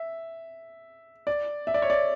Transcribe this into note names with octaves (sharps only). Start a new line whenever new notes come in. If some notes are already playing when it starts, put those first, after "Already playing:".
Already playing: E5
D5
E5
D5
C#5
D5